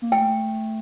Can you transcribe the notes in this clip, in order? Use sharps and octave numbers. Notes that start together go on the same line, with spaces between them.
A#3
A3 G5